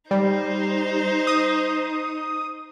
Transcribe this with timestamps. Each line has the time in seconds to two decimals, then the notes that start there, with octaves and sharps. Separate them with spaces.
0.11 G3 D#4 C5
1.27 D#6